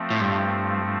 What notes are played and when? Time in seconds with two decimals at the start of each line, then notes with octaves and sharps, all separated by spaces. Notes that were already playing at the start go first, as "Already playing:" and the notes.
Already playing: F3 A3 C4
0.10 A2
0.20 G2